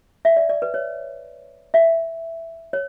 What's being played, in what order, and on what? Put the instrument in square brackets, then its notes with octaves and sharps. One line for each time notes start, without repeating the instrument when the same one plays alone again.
[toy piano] E5
D5
D5
B4
C#5
E5
C#5